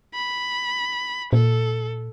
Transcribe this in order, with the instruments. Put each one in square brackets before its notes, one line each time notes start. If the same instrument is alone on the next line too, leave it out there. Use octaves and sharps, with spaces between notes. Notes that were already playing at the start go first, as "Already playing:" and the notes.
[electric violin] B5
[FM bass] A#2 [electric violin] A4